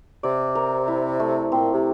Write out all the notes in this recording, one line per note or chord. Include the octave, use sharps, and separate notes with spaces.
C3 D5
A#4
E4
A3
A#2 C4
C3